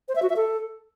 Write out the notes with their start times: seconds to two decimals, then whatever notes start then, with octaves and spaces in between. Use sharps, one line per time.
0.09 C5
0.16 E5
0.23 F#4
0.29 E5
0.36 A4